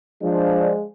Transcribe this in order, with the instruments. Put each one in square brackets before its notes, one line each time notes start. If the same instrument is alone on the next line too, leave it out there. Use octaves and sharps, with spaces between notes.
[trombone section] F3 D4 [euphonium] G#3